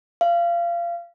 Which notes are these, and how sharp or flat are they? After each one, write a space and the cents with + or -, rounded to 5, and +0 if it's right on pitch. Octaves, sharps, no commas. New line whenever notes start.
F5 -25